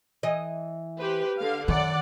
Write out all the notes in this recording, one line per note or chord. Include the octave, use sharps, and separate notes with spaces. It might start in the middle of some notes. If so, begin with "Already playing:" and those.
E3 D#5
G4 B4 C5
D3 F5
F#2 D#3 D5 F#5